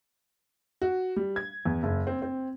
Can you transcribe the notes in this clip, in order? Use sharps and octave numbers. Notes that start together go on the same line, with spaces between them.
F#4
G3
G#6
E2
F#1
C4
C4